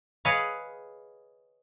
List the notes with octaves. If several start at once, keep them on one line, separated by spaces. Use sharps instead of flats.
G#4 B4 C#5 D#5 F5